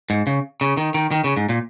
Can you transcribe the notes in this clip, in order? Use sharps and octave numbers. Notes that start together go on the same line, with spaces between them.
G#2
C#3
C#3
D#3
D#3
D#3
C#3
G#2
A#2